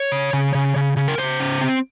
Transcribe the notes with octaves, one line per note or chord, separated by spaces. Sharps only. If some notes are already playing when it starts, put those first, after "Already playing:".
Already playing: C#5
C#3
C#3
C#3
C#3
C#3
A#4
C#3 C5
C#4
C4